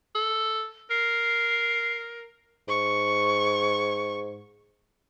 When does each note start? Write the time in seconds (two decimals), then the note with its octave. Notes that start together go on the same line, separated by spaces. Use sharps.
0.15 A4
0.91 A#4 C7
2.68 G#2 C#6